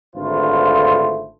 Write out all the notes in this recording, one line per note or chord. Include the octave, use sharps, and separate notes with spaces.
G#1 D3 A3 F4 B4 C5